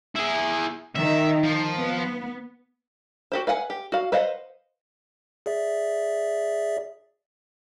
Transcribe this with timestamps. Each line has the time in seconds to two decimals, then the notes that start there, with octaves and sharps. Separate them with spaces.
0.15 E4 G#4
0.96 D#3 E5
1.43 F3
1.76 B3
3.32 F#4 G4 C5
3.47 B4 F5 F#5 G#5
3.70 G4
3.92 F#4 F5
4.12 B4 C5 D#5 F5 F#5
5.46 G#4 D5 E5